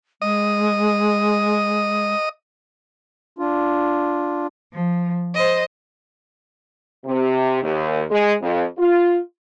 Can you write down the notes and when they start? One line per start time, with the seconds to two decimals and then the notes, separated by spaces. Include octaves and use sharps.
0.22 G#3 D#5
3.39 D4 F4
4.72 F3
5.34 C5 D#5
7.06 C3
7.63 D#2
8.10 G#3
8.42 F2
8.77 F4